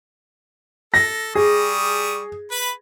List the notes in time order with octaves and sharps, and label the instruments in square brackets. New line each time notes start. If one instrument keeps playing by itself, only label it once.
[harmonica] A4 [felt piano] A#6
[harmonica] G3 C#6 D#6 [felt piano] G#4
[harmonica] B4 B5